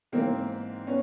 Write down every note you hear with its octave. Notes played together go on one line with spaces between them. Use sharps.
G#2 E3 A#3 C4
B3 C#4